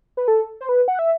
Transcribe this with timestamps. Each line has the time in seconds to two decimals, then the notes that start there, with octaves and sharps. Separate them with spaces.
0.17 B4
0.28 A4
0.61 C5
0.69 B4
0.88 F#5
0.99 E5